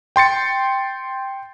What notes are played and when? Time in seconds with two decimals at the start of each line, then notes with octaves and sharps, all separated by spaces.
0.16 G5 C6 A6 C#7